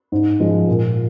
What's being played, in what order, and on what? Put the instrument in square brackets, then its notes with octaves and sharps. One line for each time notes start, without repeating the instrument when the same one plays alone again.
[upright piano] G#2
F3 G#3
A#2